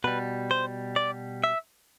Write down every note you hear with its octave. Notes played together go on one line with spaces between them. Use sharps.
B2 G3 B4
C5
D5
E5